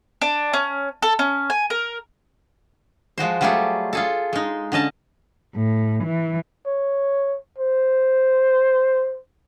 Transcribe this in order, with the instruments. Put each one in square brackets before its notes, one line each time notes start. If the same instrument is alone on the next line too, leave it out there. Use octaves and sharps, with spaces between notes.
[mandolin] D4
C#4
A4
C#4
G#5
A#4
[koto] F3 G#3 F#4 C5
F#3 G3 A3 F4 G4 G#4
F4 G#4 A4
G#3 D#4
D3 C#4 D#5 A5
[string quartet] A2
E3
[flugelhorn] C#5
C5